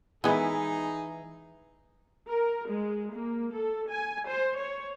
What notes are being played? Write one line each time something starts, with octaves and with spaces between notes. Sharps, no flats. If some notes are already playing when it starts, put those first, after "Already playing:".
D#3 E3 G#3 B3 D#4 E4 G#4
A#4
G#3
A#3
A4
G#5
C5
C#5